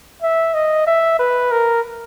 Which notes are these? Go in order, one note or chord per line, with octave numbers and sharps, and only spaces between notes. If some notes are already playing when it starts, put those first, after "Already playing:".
E5
D#5
E5
B4
A#4